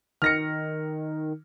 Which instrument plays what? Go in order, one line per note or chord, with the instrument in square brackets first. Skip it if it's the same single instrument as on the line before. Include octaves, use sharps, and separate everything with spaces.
[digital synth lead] D#3 [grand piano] F6 A#6 C#7